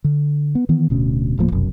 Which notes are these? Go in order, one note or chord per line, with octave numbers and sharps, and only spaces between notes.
D3
B3
D#3 E3 B3
D1 D2 B2 C#4
D#1 A2 F3 A#3
F1 B1 F#2